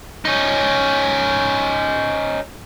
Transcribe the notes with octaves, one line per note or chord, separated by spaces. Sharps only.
C#4 D#4